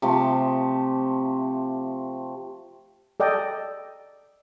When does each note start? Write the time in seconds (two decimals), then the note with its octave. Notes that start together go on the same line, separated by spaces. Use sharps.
0.02 C3 F3 A3 D6
3.20 A4 D5 D#5 G5